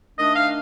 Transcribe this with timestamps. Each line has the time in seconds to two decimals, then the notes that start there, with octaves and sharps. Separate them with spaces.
0.18 D#3 A3 D4 D#5
0.35 F5